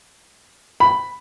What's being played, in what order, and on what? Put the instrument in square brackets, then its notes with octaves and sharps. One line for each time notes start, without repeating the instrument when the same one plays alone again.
[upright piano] B5